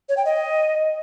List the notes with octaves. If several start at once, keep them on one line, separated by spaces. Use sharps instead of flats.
C#5
G5
D#5